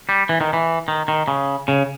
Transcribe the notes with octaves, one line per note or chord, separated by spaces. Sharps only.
G3
E3
D#3
E3
D#3
D#3
C#3
C#3